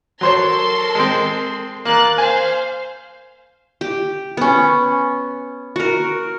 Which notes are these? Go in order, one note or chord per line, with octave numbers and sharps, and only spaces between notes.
F#3 A4 A#4 C5 C#5 C6
G#3 C4
A#3 A#4 F#6 A6
C5 F5 G#5
G4
B3 C#4
F#4 A#4